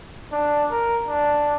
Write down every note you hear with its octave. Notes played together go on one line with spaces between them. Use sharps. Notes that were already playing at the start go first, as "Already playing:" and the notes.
D4
A#4
D4